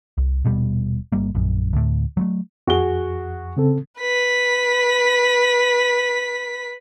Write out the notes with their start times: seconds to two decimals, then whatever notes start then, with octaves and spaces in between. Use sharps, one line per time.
0.18 C2
0.45 D#1 B2 G3
1.12 G1 G3 A#3
1.35 A#1 F#2
1.73 D2 A2
2.17 F#3 G#3 A3
2.67 F2 F#4 G#4 G7
3.57 C#3 C4 A4
4.00 B4 B6